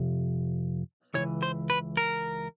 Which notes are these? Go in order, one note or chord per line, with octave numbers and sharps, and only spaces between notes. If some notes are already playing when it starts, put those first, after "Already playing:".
Already playing: F2 C3
C#2 C#3 E3 C#5
C5
B4
A#4